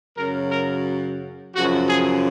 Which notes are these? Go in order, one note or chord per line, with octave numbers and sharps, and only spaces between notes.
F#2 C#3 F#3 A#4
A#4
F#2 C#3 F3 F#4
G#4